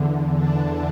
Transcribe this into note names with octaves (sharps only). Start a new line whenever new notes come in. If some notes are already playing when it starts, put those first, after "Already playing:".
Already playing: E2 D3
D4